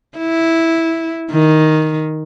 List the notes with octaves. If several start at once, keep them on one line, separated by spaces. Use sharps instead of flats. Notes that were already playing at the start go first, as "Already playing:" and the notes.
E4
D#3